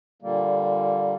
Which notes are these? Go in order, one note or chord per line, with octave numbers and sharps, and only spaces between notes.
A#2 D3 G3 A#3